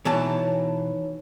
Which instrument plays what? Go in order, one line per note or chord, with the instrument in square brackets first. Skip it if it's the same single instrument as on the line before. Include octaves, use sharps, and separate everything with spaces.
[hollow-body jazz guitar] B2 E3 A5 [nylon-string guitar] D#4 C#5 E5